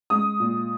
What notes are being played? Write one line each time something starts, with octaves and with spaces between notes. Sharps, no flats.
G#3 D#6
A#2